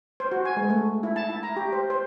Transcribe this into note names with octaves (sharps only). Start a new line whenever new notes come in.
C5
F#4
G#5
G#3
A3
E4
A5
E4
A#5
G4
C5
C5